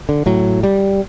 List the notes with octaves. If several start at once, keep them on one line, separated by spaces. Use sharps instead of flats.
D3
A2 F#3
G3